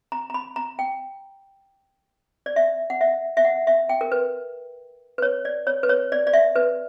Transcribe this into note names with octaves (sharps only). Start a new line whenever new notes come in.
A#5
A#5
B5
A#5
G5
D5
E5
F#5
E5
E5
F#5
E5
G5
A#4
B4
B4
C#5
D5
C#5
B4
C#5
D5
D5
E5
B4